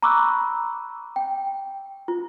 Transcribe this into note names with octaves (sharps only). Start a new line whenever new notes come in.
A#5 B5 C#6 D6 E6 F#6
G5
F4